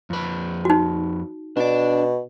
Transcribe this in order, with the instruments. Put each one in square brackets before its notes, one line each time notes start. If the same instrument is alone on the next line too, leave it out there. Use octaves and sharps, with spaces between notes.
[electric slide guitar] F2 B4
[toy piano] D#4 F#4
[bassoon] B2 [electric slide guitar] D4 D5